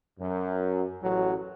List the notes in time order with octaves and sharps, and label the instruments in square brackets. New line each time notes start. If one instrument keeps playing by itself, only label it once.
[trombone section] F#2
A1 F#3